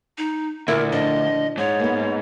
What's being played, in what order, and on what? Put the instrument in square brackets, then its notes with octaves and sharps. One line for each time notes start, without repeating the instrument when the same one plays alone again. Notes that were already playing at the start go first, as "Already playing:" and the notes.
[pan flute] D#4
[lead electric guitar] D2 [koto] A#2 E4 [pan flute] A#4
[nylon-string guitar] F3 D4 [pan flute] D#5
[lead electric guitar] G#2 [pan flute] C#5
[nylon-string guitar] A#3 B3